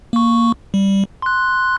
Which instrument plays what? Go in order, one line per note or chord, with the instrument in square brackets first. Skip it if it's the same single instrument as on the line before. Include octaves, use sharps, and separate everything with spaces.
[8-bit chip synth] A#3 C#6
G3
C6 F#6